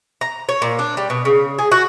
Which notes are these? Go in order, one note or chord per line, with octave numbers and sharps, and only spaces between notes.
A#5
C#5
A#2
D4
G3
B2
C#3
G#4
F#4